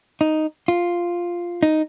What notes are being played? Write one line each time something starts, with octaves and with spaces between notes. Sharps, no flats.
D#4
F4
D#4